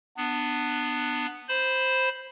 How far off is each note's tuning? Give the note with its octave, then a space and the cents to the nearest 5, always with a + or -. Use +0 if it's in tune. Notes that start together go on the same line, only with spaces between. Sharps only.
B3 +0 D4 +20
C5 +0 B5 +0